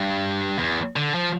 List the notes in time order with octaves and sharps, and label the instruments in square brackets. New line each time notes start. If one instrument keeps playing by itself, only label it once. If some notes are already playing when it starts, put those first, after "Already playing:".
Already playing: [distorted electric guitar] G2
E2
D3
F3